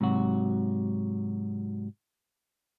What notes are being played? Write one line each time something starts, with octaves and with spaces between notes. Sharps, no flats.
G#2 C3 F#3 F#4